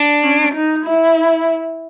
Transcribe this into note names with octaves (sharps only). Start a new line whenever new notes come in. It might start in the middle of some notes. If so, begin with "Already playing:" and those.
Already playing: D4
C#4
D#4
E4